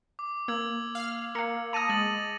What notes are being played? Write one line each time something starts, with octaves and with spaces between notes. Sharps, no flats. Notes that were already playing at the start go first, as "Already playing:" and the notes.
D6
A#3 E6 G#6 F#7
F5 F6
A#3 F5 A#5 C#7
A5 D#6 A#6 D#7 F7
G#3 A6 F#7